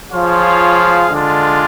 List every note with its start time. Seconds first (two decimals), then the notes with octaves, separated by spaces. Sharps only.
0.11 F3 F4 G#4 C#5 F5
1.10 D3 G#3 D4 F4